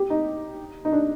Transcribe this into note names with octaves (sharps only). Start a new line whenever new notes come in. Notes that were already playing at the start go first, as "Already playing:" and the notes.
Already playing: G4
D#4
D#4
D4